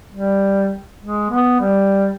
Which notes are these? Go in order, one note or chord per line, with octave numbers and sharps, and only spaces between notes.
G3
G#3
B3
G3